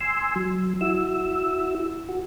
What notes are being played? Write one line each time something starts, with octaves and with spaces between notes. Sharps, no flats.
G#5 C6 E6
F#3
E4 F#4 E6
F#4